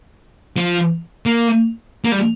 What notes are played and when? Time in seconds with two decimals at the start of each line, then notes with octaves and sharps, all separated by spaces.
0.57 F3
1.26 A#3
2.05 A#3
2.12 G3